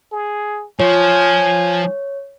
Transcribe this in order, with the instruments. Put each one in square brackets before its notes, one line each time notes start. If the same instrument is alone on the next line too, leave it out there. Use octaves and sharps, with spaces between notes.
[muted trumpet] G#4
[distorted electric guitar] F3 [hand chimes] C#5 [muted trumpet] G#5